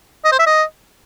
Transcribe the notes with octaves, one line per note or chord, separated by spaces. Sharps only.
D#5
C5
E5
D#5